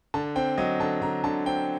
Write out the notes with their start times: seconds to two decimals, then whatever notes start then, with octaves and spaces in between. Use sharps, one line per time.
0.14 D3 A5
0.36 C4 G5
0.58 F#3 D#5
0.80 D3 A5
1.02 D3 A#5
1.24 D3 A5
1.46 C4 G5